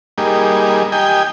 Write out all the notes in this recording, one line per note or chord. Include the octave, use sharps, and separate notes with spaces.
G3 A#3 D#4 G#4
G4 D#5 G5 G#5